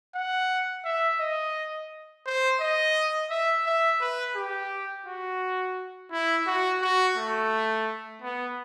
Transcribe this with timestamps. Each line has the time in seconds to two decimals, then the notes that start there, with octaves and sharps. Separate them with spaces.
0.15 F#5
0.84 E5
1.20 D#5
2.26 C5
2.61 D#5
3.30 E5
3.66 E5
4.01 B4
4.36 G4
5.06 F#4
6.12 E4
6.47 F#4
6.81 F#4
7.17 A3
8.22 B3